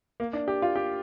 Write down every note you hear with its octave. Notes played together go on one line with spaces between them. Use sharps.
A#3
D4
G4
F4
G4